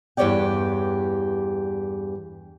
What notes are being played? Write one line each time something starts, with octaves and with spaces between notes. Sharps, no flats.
E2 G2 G4 C#5 D5 G5